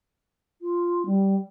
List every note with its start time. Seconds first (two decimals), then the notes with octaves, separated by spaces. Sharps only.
0.61 F4
1.06 G3